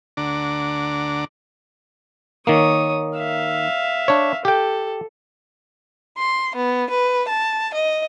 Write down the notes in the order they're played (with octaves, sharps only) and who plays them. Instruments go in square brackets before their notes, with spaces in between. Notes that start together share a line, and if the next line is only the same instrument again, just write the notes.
[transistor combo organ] D2 D3 D4 F#5 A#5 D6
[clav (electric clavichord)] D#3 A#3 [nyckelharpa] C#5 D#6
[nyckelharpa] E5 F5
[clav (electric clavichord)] D4 C#5
[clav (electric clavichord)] G4 G5 [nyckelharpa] A4
[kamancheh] C6
B3
B4
A5
D#5